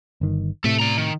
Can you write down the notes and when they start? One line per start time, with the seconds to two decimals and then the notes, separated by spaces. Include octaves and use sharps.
0.21 G1 D#3
0.64 A2 C3 A4 E5
0.80 D5 A#5
0.98 D#3